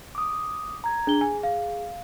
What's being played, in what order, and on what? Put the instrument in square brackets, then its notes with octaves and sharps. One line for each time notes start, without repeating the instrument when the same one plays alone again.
[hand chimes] D6 D#6
A#5 G#6
[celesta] D4 G7 [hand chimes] G#4
[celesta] G#5
F5